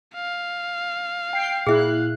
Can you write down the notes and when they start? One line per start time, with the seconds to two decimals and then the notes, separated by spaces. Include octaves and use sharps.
0.15 F5
1.33 G5 C7
1.67 A#2 E4 G#4 E5 F#6